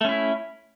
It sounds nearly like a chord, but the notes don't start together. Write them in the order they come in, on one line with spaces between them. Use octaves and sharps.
A3 C#4 E4